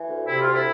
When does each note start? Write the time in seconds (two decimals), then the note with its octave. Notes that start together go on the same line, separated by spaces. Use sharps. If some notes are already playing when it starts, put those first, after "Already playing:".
Already playing: E3
0.09 D2
0.27 C3 E4
0.41 D2 F4
0.54 E4